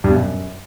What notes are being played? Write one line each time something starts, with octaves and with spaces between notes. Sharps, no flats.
G2
B2
F#2